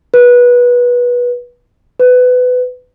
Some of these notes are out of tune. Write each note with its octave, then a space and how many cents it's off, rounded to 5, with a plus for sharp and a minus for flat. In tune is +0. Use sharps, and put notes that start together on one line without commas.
B4 -20
B4 +20